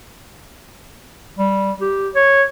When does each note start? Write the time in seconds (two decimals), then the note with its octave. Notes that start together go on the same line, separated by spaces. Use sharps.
1.38 G3
1.81 G4
2.15 C#5